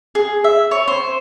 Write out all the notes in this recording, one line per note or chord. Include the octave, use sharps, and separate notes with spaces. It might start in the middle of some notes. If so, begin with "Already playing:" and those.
G#4
E5
C#5
C5